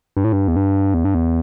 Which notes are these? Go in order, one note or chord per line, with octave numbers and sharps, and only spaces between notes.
G2
A2
G2
E2
G2
E2
G2
E2